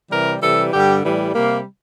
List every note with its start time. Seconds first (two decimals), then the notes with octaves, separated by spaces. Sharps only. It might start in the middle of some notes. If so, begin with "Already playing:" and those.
0.11 C3 E3 G3 A#4
0.42 C3 E3 G3 A4
0.73 G2 D3 G3 G4
1.05 A2 E3 G3
1.35 C3 G3 A#3